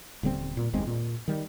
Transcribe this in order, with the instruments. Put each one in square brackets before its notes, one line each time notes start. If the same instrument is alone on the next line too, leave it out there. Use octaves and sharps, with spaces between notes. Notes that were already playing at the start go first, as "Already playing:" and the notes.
[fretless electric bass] D#1 D3 G3 C4
A#2
F#1 D#2 G#3 C4
A#2
D#3 G3